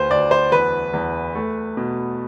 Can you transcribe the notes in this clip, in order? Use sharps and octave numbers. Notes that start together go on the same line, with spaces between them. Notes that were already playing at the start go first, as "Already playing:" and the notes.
Already playing: D2 B4 C5
D2 D5
C5
E2 B4
E2
A3
B2